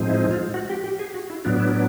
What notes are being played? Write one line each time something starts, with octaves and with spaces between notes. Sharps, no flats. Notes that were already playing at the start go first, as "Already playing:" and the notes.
Already playing: A2 F3 G#3 C4 D#4
E4
F4
F#4
G4
G4
G#4
F#4
E4
A2 F#3 B3 D4 F4
E4